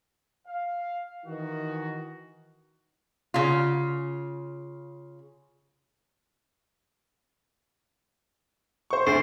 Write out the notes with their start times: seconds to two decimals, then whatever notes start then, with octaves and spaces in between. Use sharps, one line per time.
0.48 F5
1.25 D#3 E3 F#4
3.34 C#3 F4
8.90 C5 C#6
9.06 D2 A3 C5 C#6